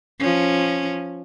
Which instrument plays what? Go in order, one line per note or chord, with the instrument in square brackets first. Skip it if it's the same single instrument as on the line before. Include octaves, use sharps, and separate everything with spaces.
[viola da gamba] F3 C#4